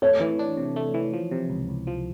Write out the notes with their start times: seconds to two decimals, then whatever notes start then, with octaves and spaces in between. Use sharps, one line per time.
0.02 A3 C#5
0.20 E3
0.39 D4
0.57 C3
0.76 A3
0.94 E3
1.13 F3
1.31 C3
1.50 C#2
1.69 C#2
1.87 F3